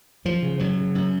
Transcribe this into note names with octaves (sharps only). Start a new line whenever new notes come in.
F#2 F3
C#3
F#2 F#3
C#3
F#2